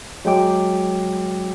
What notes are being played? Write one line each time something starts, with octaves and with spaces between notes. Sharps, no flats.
F#3 G#3 G5 D6